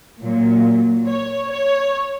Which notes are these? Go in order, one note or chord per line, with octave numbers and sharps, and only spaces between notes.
A#2 F#3
C#5
C#5